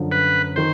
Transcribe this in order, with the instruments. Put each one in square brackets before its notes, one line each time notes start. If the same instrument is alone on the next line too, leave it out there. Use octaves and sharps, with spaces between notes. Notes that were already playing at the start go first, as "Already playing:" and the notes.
Already playing: [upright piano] F#2 D3 F3
[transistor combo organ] B4
[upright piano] D#3 [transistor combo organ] C5